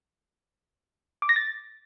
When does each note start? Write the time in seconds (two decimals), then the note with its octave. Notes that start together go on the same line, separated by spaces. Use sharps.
1.22 D6
1.29 A#6
1.36 A6